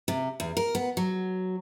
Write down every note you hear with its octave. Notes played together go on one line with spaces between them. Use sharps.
C3
E2
A#4
B3
F#3